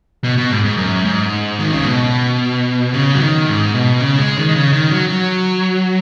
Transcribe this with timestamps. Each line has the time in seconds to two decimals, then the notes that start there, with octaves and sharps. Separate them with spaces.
0.24 B2
0.38 B2
0.51 G#2
0.65 G#2
0.77 F#2
1.05 G#2
1.59 D#3
1.73 C#3
1.85 B2
2.94 C#3
3.15 F#3
3.20 D#3
3.47 G#2
3.75 B2
4.00 C#3
4.19 G#3
4.37 D#3
4.49 D#3
4.55 C#3
4.73 D#3
4.90 F#3
5.09 F#3